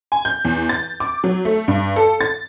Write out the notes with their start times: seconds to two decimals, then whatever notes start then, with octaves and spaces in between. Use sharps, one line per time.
0.12 G#5
0.25 G6
0.45 E2
0.69 A6
1.00 D6
1.24 F#3
1.45 A3
1.68 G2
1.96 A4
2.21 A6